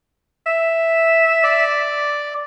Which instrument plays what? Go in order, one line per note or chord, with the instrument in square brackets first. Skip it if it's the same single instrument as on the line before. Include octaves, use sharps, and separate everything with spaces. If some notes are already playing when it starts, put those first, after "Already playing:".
[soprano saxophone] E5
[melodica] D5